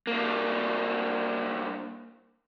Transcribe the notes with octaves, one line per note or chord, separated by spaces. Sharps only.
G2 A#3